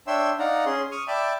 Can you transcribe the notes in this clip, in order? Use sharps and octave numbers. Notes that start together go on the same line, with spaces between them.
D4 C#5 E5 G5 C6 E6
D#4 D5 F5 F#5 A#5
C#4 G#4 C6
C#6 D#6 F6
D5 E5 G5 A5 B5 D6